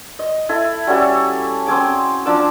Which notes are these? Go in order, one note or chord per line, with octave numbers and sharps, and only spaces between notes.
D#5
E4 A4
G3 C#4 F#4 A4
C4 C#4 G#4 D6
F3 D4 D6 E6